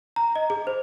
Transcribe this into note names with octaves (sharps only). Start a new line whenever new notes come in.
A#5
D#5
G#4
C5